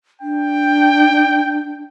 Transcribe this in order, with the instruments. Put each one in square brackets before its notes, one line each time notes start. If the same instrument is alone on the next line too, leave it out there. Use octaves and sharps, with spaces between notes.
[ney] D4 [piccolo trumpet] G5